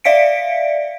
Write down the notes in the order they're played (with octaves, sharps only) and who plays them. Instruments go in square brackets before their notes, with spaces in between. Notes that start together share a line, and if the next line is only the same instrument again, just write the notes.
[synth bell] D5 E5 F5 B6 C#7 D7